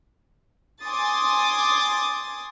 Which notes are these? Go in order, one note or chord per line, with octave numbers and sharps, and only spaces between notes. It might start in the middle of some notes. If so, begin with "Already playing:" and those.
G#5 C6 D6 D#6 A6